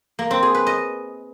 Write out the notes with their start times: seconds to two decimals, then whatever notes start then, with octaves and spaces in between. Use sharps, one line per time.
0.19 A#3
0.31 C4
0.43 G#4
0.55 B4
0.66 D#5